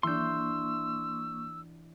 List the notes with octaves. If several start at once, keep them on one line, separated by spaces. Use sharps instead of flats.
E3 A#3 D4 C6 C#6 E6 G6